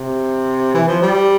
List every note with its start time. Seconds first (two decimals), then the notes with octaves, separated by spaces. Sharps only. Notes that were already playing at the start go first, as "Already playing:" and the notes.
Already playing: C3
0.74 E3
0.88 F3
1.02 G3